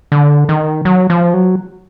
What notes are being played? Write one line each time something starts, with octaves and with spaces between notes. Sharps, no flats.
D3
D#3
F#3
F3
F#3